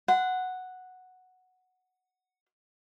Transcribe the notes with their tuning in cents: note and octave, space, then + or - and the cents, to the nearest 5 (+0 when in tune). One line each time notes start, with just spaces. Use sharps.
F#5 +0 C6 -35